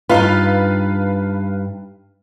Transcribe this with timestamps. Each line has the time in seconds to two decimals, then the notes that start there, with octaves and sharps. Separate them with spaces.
0.10 G2 D#4 F4 B4 F5